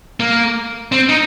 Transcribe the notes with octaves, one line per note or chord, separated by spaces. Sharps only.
A#3
C4
D#4